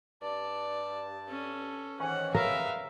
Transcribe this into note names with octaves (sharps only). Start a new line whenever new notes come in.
G2 D5 A5
C#4 A4
G#2 D#3 E3 C#4 F#5
G#3 A#4 B4 E5 F5